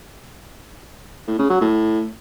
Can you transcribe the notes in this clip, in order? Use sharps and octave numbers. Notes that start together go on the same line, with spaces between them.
A2
C#3
F#3
A2